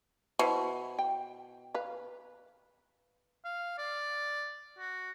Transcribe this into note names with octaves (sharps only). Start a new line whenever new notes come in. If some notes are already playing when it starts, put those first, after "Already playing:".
B2 E4 C5
G5
B4 F5
F5
D5
F#4